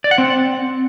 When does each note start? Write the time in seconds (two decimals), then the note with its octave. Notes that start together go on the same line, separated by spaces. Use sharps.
0.04 D5
0.11 F#5
0.18 C4